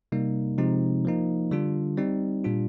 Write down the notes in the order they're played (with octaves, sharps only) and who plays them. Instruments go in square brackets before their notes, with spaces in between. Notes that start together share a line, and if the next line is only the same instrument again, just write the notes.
[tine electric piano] C3 G3 A#3 D#4
C3 F3 G#3 C4 D#4
F3 A#3 D#4
D3 G3 D4 F4
G3 C4 D#4
A#2 G3 D4 F4